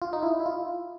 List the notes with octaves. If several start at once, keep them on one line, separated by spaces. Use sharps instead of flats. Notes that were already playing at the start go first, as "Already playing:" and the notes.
F4
D#4
E4
E4
F4